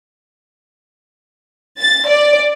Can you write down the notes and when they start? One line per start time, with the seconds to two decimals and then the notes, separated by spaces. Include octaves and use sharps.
1.79 A6
2.09 D5